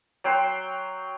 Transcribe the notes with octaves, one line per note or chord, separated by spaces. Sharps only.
F#3 G5 C6